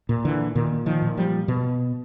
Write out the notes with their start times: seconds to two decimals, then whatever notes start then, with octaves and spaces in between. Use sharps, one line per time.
0.09 A#2
0.25 D3 E3
0.55 A#2 D#3
0.86 D#3 F3
1.02 A#2
1.17 F3 G3
1.48 B2